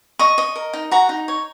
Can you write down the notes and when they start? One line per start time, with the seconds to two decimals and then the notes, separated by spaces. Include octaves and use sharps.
0.19 D#5 C#6
0.38 D#5
0.56 A#4
0.73 D#4
0.91 F#4 A#5
1.09 D#4
1.28 C#5